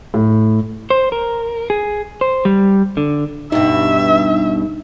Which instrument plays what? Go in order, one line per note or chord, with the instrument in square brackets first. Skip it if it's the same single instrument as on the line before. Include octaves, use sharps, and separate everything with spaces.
[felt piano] A2
[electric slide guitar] C5
A#4
G#4
C5
G3
D3
[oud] G2 B2 [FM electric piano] D#4 [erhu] E5